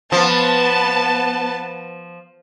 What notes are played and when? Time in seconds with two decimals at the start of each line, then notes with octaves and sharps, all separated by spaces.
0.12 F3 B3 A5